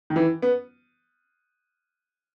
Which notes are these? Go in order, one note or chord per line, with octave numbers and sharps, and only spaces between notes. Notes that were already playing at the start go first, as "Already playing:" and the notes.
D#3
E3
B3